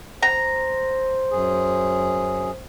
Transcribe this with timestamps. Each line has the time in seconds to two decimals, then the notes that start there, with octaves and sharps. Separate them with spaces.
0.23 C5 A#5
1.31 F#2 G#4